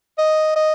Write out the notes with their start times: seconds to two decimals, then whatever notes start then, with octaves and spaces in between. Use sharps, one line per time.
0.18 D#5
0.56 D#5